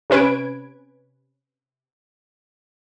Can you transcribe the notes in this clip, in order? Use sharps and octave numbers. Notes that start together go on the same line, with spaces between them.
C3 C#4 B4 G#6 D7